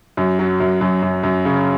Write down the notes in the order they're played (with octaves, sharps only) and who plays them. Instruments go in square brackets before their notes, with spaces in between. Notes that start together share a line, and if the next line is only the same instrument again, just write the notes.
[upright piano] F#2
F#3
F#2
F#2
F#2
F#2
C#3